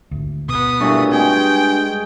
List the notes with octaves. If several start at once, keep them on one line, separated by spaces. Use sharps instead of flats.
G#1 D2
B2 B3 D#6
G2 A#2 F#3 A3
G#3 B3 C4 G#4 G5